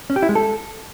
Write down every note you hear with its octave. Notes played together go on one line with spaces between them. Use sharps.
C#4
G4
E4
G#3
A4